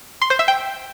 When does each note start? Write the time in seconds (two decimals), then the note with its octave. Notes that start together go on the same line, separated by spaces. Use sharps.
0.21 C6
0.30 C5
0.39 E5
0.48 G5